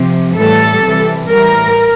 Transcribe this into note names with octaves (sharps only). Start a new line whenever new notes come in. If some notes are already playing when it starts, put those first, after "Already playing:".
Already playing: C3 F3
A2 E3 G3 A4
C3 E3 G3
A2 E3 G3 A#4